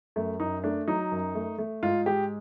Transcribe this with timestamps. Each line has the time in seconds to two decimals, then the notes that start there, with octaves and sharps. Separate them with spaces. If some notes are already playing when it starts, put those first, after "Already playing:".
0.16 F#2 A3
0.40 F#2 D#4
0.64 A3 D4
0.88 F#3 D#4
1.11 F#2
1.35 A3
1.58 A3
1.83 G#2 F4
2.06 G#3 G4